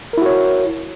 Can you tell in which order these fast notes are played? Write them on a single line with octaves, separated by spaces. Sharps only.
A#4 E4 F#4 C#5